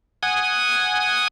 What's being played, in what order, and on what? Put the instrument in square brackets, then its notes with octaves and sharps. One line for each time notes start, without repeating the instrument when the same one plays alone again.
[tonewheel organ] F#5 G#5 D#6